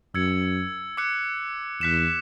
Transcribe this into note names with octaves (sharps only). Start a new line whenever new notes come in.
F#2 E6 G#6 C#7
D6 F#6 C#7
E2 F#6 B6 E7